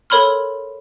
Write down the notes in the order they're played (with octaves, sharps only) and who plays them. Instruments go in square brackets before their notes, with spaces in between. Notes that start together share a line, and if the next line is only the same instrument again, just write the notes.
[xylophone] A4 A#4 C#5 B5 C6 F6